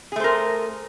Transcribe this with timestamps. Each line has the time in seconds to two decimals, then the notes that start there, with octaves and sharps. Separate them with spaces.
0.12 G#4
0.16 A3
0.20 C5
0.24 A#4